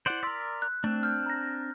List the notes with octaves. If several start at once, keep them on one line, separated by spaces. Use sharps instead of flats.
E4 C5 D5 F#5 F#7
A#4 D5 C6 E6 B6
F#6
A3 C4 D4
F6 G6
A#5 A#6